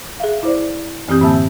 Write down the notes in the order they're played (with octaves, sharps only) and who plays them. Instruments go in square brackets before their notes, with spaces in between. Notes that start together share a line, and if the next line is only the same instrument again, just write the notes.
[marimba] G#4 E5 F5
E4 C5 D5
F#2 E3 C4 G4 D#6 G6
A2 D3 A#3 E5 A5 E6